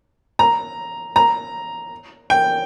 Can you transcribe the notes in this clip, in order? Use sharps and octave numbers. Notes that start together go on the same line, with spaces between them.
A#5
A#5
G5